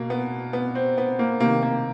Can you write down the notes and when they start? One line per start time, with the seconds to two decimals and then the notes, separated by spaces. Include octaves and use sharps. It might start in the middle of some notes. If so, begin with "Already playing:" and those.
Already playing: B2 A#3
0.10 B3
0.53 B3
0.75 C4
0.98 B3
1.19 A#3
1.40 C3 D#3 A#3
1.63 A#3